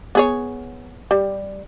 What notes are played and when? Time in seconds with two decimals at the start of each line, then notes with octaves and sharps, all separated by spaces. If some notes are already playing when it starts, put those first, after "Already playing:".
0.15 B3 G#4 C#5
1.11 G3